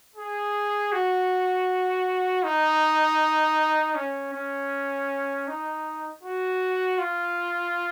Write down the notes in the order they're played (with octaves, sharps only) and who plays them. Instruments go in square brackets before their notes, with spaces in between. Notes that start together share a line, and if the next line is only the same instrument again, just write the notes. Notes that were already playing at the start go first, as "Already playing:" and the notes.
[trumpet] G#4
F#4
D#4
C#4
C#4
D#4
F#4
F4